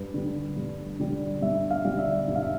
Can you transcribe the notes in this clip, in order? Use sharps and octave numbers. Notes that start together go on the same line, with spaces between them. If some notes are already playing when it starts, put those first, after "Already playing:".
Already playing: G2 B4
D3 G3
G2
D3 G3
G2 E5
F5
D3 G3
E5
G2
F5
E5